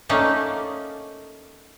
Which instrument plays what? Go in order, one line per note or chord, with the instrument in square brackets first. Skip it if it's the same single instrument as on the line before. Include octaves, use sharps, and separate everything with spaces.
[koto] A3 A#3 C#4 D#4 D5